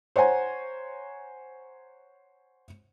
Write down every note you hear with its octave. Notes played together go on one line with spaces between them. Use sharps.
C5 C#5 F#5 G#5 A#5